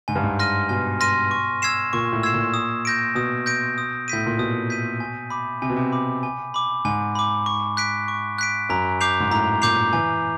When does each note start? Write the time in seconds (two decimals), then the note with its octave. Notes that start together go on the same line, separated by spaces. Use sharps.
0.08 G#2 G#5
0.15 G2
0.24 G#2
0.39 C6 F6 A#6 D#7
0.69 B2 G#5
1.00 C6 F6 A#6 D#7
1.31 C#6
1.62 E6 G#6 C7 E7
1.93 A#2 C#6
2.12 A2
2.23 E6 G#6 C7 E7
2.34 A#2
2.54 D#6
2.85 G6 A#6 D7
3.15 B2 D#6
3.46 G6 A#6 D7
3.78 D#6
4.08 A2 G6 B6 D#7
4.26 A#2
4.38 B2 D#6
4.70 G6 B6 D#7
5.00 G#5
5.30 B5 D6
5.62 C3 G#5
5.70 B2
5.76 C3
5.92 B5 D6
6.23 G#5
6.54 B5 D6
6.85 G#2 G#5
7.15 B5 D6
7.46 C#6
7.77 F#6 B6 D7
8.08 C#6
8.39 F#6 B6 D7
8.69 F#2 A#5
9.01 D6 G6 C7 F7
9.20 G#2
9.31 A2 A#5
9.62 A#2 D6 G6 C7 F7
9.93 E3 G#5